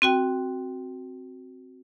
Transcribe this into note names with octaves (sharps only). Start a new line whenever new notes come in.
C4 F#4 G5